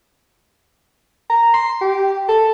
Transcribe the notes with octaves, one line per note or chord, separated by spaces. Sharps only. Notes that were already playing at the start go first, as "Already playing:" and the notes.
A#5
C6
G4
A4